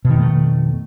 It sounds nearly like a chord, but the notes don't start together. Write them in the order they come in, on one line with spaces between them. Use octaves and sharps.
B2 D#3 F2 A3